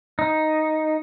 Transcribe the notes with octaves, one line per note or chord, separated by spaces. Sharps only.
D#4